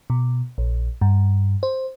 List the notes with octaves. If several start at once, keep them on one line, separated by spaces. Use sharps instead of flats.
B2
A#1
G2
C5